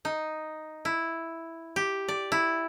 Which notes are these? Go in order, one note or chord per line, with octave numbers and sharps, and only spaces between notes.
D#4
E4
G4
D5
E4